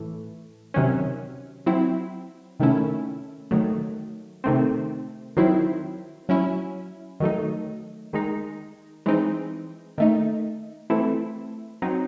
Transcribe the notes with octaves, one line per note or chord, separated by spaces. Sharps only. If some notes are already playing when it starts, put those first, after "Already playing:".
Already playing: A2 E3 A3
C3 D#3 F#3 C#4
F#3 C4 E4
C3 D#3 A3 C#4 E4
D#3 F#3 A3
C3 D#3 A3 C4
D#3 F#3 C4 E4
F#3 C#4 E4
D#3 F#3 A3 D#4
D#3 G#3 D#4
E3 G#3 C4 D#4
D#3 A3 D#4
E3 A3 C4 E4
F#3 C4 D#4